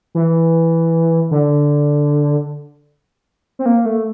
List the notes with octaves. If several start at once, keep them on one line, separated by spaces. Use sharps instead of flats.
E3
D3
C4
A#3
A3